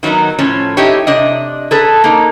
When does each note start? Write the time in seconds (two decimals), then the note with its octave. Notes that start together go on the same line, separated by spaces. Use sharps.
0.03 D#3 F#3 A#3 B3 D#4
0.39 A2 F3 C#4
0.77 D#4 E4 G4 C#5
1.07 C3 D4 D#5
1.71 G#4 A4 B4
2.04 A#3 D#4